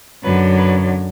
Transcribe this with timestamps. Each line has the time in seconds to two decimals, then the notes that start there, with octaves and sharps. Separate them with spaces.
0.24 F#2 D3 F#3 B4
0.58 B4